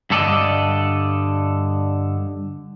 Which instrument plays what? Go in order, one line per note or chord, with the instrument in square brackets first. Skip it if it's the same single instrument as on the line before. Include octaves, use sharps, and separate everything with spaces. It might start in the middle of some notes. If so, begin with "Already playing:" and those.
[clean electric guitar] G2 D3 A4 D5 D#5